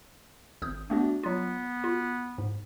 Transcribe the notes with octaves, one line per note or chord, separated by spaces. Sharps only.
G#1 D#6 G6
A3 B3 D4 F#4
F#3 B3 F4
F4
G#2